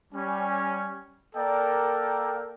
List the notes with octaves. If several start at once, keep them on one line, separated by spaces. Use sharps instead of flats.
G3 C#4
A#3 A4 A#4 D5 G5